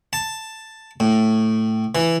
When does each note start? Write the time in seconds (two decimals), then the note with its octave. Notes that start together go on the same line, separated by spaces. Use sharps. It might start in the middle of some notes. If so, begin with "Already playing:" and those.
0.13 A5
1.00 A2
1.95 E3